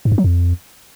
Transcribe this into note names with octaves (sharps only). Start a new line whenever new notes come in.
G#2
G2
F#3
F2